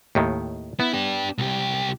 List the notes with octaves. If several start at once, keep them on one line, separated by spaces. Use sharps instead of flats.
D#2 A2 D#3
B3 E4
D4 G4
C2 G4